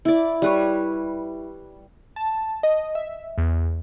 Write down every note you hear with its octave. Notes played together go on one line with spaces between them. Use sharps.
E4 D5
G3 B4 C#5
A5
D#5
E5
E2